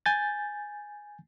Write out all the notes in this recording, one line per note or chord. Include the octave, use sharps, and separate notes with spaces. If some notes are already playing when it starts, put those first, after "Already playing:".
G#5 G6 A6